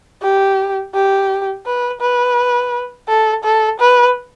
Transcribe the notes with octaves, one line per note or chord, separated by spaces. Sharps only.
G4
G4
B4
B4
A4
A4
B4